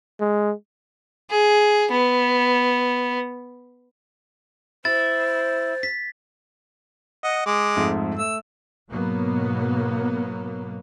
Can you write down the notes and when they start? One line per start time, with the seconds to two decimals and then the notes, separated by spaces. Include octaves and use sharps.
0.20 G#3
1.31 G#4
1.91 B3
4.85 E4 C5 A6
5.83 B6
7.24 D#5 F#5
7.46 G#3 D6
7.76 F2 G#2 A3
8.19 A3 E6
8.88 G#2 B2 F#3 A#3 B3